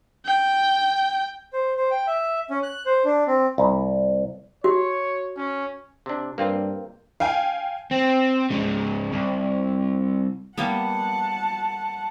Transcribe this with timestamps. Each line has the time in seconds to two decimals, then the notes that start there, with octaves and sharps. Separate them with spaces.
0.25 G5
1.53 C5
1.76 C5
1.90 G5
2.07 E5
2.50 C#4
2.63 F#6
2.86 C5
3.05 D4
3.27 C4
3.58 C2
4.64 F#4 C#5
5.37 C#4
6.06 C3 D4
6.38 G2 A#3 C4 F4
7.20 F5 G5 G#5
7.91 C4
8.50 G#2 C#3
9.13 C2
10.58 G3 A#3 B3 F#5 A5